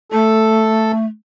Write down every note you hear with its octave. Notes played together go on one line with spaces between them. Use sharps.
A3 A4